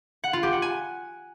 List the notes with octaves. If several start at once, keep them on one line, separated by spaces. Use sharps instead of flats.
F#5
F4
G4
F#5
G#5